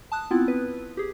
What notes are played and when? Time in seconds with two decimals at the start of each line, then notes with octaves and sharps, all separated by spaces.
0.12 A5 D#6 F#6
0.31 B3 C4 E4 F4
0.48 B4
0.97 G4 G#4